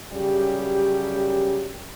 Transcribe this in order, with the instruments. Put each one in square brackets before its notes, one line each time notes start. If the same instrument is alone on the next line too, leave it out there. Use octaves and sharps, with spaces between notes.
[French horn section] F#2 C#3 G3 G4